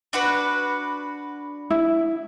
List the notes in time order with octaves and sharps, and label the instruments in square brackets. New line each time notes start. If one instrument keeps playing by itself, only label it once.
[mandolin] D4 F#4 B4
[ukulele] E4